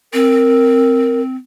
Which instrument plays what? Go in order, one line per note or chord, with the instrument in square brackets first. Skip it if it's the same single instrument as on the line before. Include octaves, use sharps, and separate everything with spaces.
[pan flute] C4 [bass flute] A#4